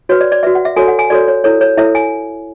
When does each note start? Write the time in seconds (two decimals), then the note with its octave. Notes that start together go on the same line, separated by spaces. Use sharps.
0.09 F#4 B4 C#5
0.21 D5
0.32 D5
0.43 F#4 B4 E5
0.55 F#5
0.65 E5
0.76 F#4 A4 C#5 G#5
0.88 F#5
0.99 G#5
1.10 F#4 A4 C#5 D5
1.28 C#5
1.44 E4 A4 C#5
1.61 C#5
1.77 E4 A4 C#5 E5
1.95 G#5